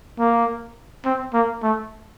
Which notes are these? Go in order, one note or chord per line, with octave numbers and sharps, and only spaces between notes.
A#3
C4
A#3
A3